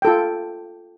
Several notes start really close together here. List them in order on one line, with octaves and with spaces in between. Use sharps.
G5 A4 F4